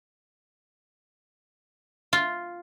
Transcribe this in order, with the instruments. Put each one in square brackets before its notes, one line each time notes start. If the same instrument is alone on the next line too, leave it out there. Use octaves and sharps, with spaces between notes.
[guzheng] F4